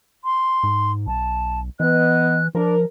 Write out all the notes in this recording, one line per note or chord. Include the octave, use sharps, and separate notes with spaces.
C6
G#2
B1 A5
E3 B3 D#5 F#6
F3 D4 A#4